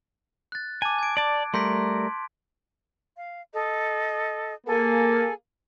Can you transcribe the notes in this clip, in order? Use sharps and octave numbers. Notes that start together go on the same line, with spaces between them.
F#6 A6
G#5 A5 D6
G#6 D7
D5 A5
G3 A3 A#4 C6 G6 B6
F5
A4 D#5
A#3 G#4 A4 G#5